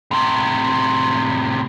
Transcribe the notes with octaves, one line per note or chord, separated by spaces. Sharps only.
A2 C3